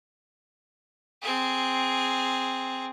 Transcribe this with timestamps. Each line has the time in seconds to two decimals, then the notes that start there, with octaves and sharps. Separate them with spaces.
1.23 C4 G#4